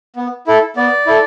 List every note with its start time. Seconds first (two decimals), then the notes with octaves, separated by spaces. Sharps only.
0.16 B3
0.47 E4 A4
0.76 B3 D5
1.07 E4 A4